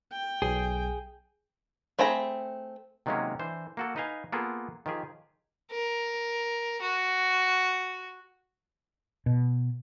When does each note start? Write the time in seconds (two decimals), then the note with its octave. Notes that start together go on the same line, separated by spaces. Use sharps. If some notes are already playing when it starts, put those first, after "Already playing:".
0.12 G5
0.42 B1 G#4
1.99 A3 C4 G#4 A#5 B5
3.06 C3 D#3 F#3 G#3 A#3 C#4
3.39 E3 D4 C5
3.77 A#3 F#4 A4
3.96 D#4 B4 D#5 F5 G#5
4.32 A#3 B3 F4 G#4 A4
4.86 D#3 F3 G4 G#4
5.71 A#4
6.81 F#4
9.26 B2